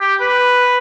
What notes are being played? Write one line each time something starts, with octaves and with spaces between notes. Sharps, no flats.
G4
B4